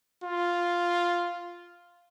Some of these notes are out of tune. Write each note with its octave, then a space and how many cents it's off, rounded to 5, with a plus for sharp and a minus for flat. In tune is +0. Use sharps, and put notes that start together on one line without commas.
F4 +0